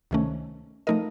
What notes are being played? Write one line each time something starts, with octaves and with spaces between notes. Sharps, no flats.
C#2 C3 D#3 A3 C#4
F3 A3 D#4 A#4 D#5